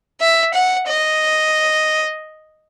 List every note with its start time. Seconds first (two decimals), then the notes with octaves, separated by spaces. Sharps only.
0.21 E5
0.54 F#5
0.87 D#5